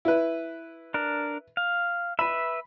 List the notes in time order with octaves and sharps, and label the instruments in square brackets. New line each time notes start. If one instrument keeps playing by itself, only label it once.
[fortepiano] E4 B4
[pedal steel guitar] D4 A#4
F5
[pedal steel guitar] B4 E5 [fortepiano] B5